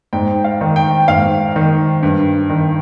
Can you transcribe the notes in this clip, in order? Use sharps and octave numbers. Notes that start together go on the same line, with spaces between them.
G#2 G5
F5
D#3
G5
G#2 F5
D#3
G2
D#3